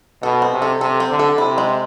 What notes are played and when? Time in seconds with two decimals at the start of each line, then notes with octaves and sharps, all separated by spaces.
0.23 B2 A4
0.42 C4
0.52 C3
0.62 A4
0.81 C3 A4
1.00 C4
1.10 D3
1.19 A4
1.38 C3 E4
1.58 G#3